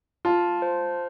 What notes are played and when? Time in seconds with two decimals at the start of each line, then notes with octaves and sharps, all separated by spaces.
0.25 F4 A5
0.62 C5